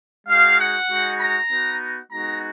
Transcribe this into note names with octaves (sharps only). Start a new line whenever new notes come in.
G#3 D#4 F#4 F5
F#5
G#3 D#4 F#4
A#5
B3 D#4 F#4
G#3 B3 D#4 F#4 A#5